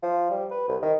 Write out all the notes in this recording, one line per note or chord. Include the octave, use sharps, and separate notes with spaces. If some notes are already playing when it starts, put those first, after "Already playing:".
F3
G3
B4
C2
D#3